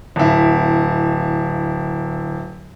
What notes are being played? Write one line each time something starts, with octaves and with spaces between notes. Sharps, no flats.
D1 E4